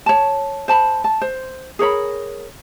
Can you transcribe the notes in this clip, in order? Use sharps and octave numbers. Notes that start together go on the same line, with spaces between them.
C#5 A5
C5 A5 B5
A5
C5
G#4 A#4 C#5 B5